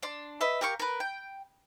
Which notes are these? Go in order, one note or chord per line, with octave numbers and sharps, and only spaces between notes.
D4 C6
B4 D#5 E5
G4 A#4 F5 C#6
A#4 B4
G5